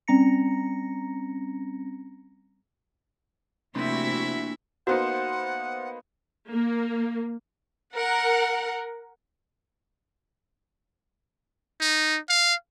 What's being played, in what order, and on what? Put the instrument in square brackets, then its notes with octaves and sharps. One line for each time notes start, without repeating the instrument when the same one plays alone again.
[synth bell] G3 C4 C#4 A#5 A#6 C#7
[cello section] C3 A3 F#4 [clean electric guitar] A#3 D4 C6 [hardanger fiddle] E4 E5
[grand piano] A#3 B3 D#4 [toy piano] F#4 [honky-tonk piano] C5 [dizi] F#5
[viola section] A#3
[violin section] A#4 F#5
[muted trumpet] D#4
F5